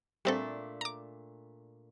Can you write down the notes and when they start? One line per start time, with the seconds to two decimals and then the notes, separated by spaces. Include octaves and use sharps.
0.25 A#2 G3 A3 C4 D4 A4
0.81 A#5 D6